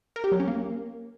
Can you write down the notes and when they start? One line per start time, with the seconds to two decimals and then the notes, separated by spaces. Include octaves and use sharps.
0.16 A#4
0.24 G4
0.32 F#3
0.40 C#4
0.48 A#3